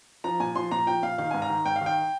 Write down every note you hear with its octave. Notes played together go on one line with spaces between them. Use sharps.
F3 A#5
A#2 G#5
F3 C6
A#2 A#5
F3 G5
A#2 F5
D#3 F5
G#2 G#5
A#5
D#3
G#2 G5
F5
D#3
G5